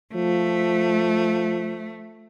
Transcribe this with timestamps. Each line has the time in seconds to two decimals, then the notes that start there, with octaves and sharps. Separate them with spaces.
0.15 F3 A3